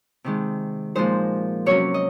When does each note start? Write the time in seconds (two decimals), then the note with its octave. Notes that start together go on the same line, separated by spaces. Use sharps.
0.24 C3 D#3 G#3
0.95 A#2 F3 G#3 D#4 C5
1.66 C3 F#3 C#4 C#5
1.94 D#5